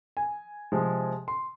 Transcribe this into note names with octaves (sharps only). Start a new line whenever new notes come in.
G#5
C3 F3 G#3
C6